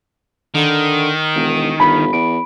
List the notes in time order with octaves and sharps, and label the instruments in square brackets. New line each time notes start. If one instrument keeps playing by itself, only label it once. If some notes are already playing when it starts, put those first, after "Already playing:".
[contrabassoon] D3 [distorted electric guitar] D#3
[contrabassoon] E1
[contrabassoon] G1 [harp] B5
[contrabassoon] E2 [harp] D7